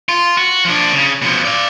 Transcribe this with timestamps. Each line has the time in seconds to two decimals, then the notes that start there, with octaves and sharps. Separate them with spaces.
0.09 F4
0.37 F#4
0.65 F3 D4
0.93 C#3
1.22 B2 F3
1.45 D5 F5